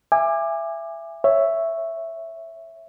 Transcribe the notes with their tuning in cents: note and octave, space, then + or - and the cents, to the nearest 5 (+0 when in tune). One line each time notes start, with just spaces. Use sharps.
E5 +15 G#5 -20 D6 +20
C#5 +0 E5 +0